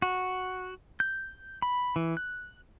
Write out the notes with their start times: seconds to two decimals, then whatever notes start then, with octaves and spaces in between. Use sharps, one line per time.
0.02 F#4
1.00 G6
1.62 B5
1.96 E3
2.17 F#6